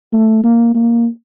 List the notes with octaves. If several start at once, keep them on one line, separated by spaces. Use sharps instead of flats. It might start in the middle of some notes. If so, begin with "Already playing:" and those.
A3
A#3
A#3